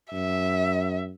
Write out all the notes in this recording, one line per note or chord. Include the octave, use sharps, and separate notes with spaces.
F#2 E5